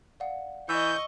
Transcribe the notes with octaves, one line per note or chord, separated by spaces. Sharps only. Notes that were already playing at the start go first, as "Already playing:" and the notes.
D5 F5 F#5
E3 D#5 C#6 E6 G6